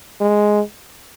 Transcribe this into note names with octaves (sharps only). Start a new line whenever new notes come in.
G#3